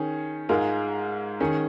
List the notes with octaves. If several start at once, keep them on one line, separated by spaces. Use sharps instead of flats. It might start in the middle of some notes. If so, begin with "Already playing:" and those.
Already playing: D#3 C#4 G#4
G#2 G#3 F4 A#4
D#3 C#4 G#4